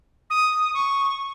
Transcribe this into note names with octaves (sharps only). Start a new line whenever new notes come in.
D#6
C#6